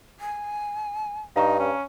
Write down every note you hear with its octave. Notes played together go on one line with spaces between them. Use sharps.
G#5
G2 D#4 F5 A#5 C#6
C#4